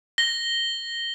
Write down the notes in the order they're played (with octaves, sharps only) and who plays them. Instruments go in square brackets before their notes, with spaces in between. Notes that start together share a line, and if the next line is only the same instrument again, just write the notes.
[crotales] A#6 G7